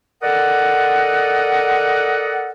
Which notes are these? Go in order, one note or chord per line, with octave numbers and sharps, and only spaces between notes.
A4 A#4 D5 D#5 F#5